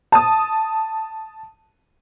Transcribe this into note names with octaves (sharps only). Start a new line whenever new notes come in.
A5 D#6